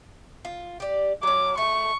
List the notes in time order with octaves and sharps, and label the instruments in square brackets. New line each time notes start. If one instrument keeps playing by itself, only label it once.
[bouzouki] F4
G4 D5
[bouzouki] F#3 C#4 [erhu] D6
[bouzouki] A3 [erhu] C#6